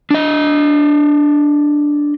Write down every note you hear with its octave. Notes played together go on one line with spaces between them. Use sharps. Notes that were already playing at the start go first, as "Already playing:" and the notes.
D4 D#5